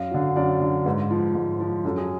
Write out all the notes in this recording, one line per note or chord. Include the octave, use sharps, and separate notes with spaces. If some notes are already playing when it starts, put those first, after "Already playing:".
Already playing: F#2 F5
D3 F#3
F#2 D5
D3 F#3
G#2 B4
F3
G#2
F3
F#2 A4
G#4